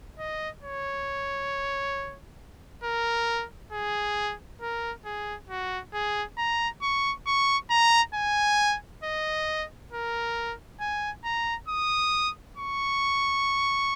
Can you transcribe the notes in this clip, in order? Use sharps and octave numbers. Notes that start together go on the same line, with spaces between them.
D#5
C#5
A#4
G#4
A#4
G#4
F#4
G#4
A#5
C#6
C#6
A#5
G#5
D#5
A#4
G#5
A#5
D#6
C#6